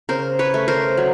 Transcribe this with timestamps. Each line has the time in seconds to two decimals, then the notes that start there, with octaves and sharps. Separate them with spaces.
0.09 C#3 A#4 C5
0.39 B4 C#5
0.54 A3
0.68 A#4 C5
0.97 F#3